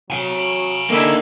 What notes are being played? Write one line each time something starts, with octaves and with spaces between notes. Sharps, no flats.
F#3 F5 G#5
D3 A#3 D#4 E4